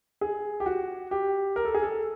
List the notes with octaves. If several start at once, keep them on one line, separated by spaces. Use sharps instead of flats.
G#4
G4
F#4
G4
A#4
A4
G#4
A4